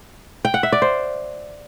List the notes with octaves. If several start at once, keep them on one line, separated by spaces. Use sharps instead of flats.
G5
F#5
E5
D5
C5